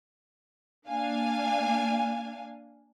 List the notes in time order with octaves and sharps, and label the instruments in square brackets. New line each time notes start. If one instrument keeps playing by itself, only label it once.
[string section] A#3 D4 F5 G#5